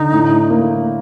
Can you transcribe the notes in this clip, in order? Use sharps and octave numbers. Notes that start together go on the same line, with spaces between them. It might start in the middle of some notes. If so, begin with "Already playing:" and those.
Already playing: D3 D#4
A2
A#3